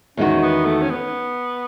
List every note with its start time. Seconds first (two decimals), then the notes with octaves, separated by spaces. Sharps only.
0.17 E2 D#3 G#3 C#4 D#4 F#4
0.42 B3
0.65 A3
0.82 C#4
0.90 B3